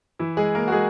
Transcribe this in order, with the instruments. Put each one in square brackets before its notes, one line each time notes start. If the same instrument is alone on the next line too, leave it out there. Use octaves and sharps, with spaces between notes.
[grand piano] E3 E4
G#3 G#4
A#3 A#4
F#4
G#3 G#4